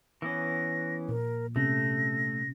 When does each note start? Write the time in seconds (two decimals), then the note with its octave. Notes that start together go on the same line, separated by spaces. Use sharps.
0.22 E3 B3 C#4 A#6
1.09 A#2 A#4
1.56 C3 A3 C#4 A#6